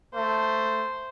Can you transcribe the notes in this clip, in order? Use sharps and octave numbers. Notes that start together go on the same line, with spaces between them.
A3 C5